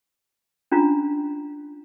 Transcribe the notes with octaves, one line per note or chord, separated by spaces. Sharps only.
C#4 D4 F4 A#5